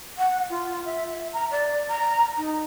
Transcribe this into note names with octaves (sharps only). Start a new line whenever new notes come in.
F#5
F4
E5
E5
A#5
D5
A#5
D#4